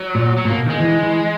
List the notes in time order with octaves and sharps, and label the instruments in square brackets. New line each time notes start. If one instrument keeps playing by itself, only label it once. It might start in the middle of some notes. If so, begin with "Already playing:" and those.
Already playing: [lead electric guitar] F#3
[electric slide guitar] A#2
[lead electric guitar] F#3
[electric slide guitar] A#2
[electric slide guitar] B2 [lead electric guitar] A#3
[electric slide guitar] D#3 [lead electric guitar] G#3
[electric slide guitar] E3
E3